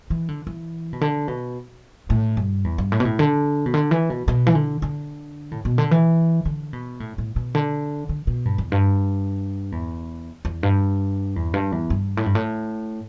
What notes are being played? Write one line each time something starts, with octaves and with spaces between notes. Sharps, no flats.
E3
D3
E3
B2
D3
B2
A2
G2
E2
G2
A2
B2
A2
D3
B2
D3
E3
B2
B2
E3
D3
D3
A2
B2
D3
E3
D3
B2
A2
A2
B2
D3
D3
B2
G2
E2
G2
E2
E2
G2
E2
G2
E2
G2
A2
G2
A2